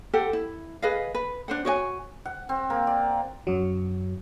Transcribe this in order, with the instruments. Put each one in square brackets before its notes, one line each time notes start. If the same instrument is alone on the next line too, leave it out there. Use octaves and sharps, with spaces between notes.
[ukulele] G4 A4 C5 F#5
E4
G#4 B4 D#5 F5
B4
D4 C5 F#5
F#4 C#5 D5 G#5
[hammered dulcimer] F#5
C4
A#3
D5
[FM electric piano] F#2 F#3